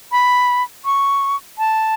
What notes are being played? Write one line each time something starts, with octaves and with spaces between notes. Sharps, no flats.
B5
C#6
A5